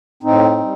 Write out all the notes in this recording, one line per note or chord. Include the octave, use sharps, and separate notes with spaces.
A2 C4 D#4
G3